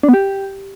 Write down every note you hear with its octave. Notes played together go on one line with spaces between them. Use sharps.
D4
B3
G4